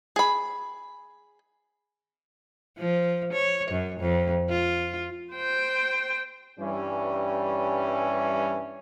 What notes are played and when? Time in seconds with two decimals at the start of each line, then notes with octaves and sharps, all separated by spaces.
0.16 G#4 B5
2.78 F3
3.33 C#5
3.71 F#2
4.00 F2
4.49 F4
5.33 C5 G5
6.59 G2 E3 G3 C#4